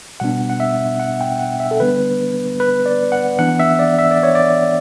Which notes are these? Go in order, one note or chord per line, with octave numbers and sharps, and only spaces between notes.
B2 G3 B3 D4 F#5
F#5
E5
F#5
G5
F#5
E5
A4
D3 G3 B3 D4 B4
B4
D5
F#5
E3 B3 D4 F#5
E5
D5
E5
D5
C#5
D5